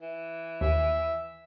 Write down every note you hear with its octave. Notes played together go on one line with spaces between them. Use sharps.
E3
D#2 E5